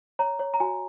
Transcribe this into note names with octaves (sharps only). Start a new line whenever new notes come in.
C#5 A#5
C#5
A#5
F#4 G#5